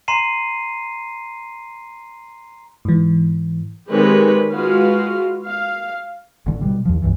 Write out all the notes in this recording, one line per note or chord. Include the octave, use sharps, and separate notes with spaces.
A#5 C6 C7 D#7
G#2 E3
D#3 G#3 C4 G4 B4 C#5
G#3 F4 F#4 B4 F5
F5
A1 D3
B2 G3
D#2 F3
C#2 G2 E3